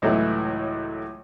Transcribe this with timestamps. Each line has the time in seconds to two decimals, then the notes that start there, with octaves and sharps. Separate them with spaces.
0.02 C#2 A2 E3 F#3 A3 E4